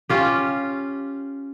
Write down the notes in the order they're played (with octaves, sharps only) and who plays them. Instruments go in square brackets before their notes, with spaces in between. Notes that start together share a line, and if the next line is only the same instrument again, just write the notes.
[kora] C#4 F4 G4